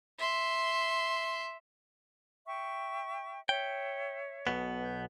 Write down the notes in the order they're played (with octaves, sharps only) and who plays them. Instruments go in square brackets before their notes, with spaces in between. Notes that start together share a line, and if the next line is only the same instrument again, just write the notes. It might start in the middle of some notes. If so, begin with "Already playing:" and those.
[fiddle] E5 C6
[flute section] E5 G5 C#6
[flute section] C#5 E5 [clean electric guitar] G5
[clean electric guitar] B1 B2 B3
[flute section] G6